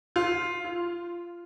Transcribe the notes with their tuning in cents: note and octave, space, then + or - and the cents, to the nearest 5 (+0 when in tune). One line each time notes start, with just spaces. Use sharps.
F4 +0
F4 -15